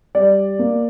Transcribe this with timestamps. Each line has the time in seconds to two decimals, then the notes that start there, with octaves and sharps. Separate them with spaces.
0.15 G3 D5
0.59 A#3